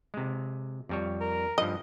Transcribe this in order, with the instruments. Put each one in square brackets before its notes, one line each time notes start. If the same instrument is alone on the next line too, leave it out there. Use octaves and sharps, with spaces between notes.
[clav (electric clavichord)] C3 G#3
F2 G3 C#5
[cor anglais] A#4
[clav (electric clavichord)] G2 F3 [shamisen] D#5